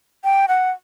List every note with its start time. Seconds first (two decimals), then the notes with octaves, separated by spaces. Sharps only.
0.24 G5
0.48 F#5